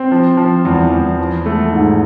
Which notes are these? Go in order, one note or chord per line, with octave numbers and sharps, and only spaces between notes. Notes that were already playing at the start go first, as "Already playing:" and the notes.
Already playing: C4
F3
F3
E2
E2
F3
A3
G#2